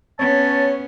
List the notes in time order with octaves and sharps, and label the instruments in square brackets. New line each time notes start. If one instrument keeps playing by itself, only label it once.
[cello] B3 C#4 [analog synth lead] C#5 [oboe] A5